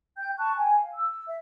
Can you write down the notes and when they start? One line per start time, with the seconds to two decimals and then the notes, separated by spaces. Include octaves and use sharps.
0.17 G5 G6
0.38 A5 C#6 F#6
0.57 G5 G#5
0.75 F5
0.95 E6
1.26 E5